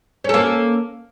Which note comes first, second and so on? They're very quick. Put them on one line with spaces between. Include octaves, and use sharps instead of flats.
C#4 A4 A#3